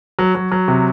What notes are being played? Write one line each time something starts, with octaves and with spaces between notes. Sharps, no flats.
F#3
F#3
F#3
C3